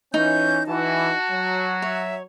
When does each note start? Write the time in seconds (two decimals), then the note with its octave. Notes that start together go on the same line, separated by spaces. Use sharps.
0.14 E3 C#4 D#4 G6
0.67 E3 F#4 A5
1.30 F#3
1.82 C#5 E5